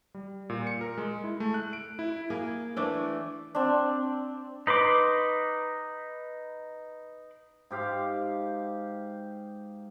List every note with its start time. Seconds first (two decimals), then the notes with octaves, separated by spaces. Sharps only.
0.14 G3
0.50 A#2
0.67 C#7
0.81 A#4
0.98 G#3
1.24 E4
1.40 A3
1.54 F#6
1.73 D7
1.99 E4
2.30 A#3 G#4
2.77 E3 A3 D4 G5
3.55 C4 D4
4.67 D#4 B4 C6 D6
7.71 G#2 G4 F5